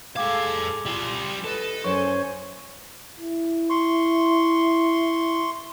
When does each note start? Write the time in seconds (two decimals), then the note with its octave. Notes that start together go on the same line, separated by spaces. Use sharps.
0.16 G3 G#3 A4 F5 G5 D6 G#6
0.86 G3 F4 C6
1.44 A4 B4 D#5
1.84 F#2 B4 C5 G#5 C#6
3.20 E4
3.70 C6 C#6